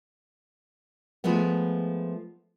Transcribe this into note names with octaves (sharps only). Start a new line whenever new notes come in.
F3 G#3 A3 B3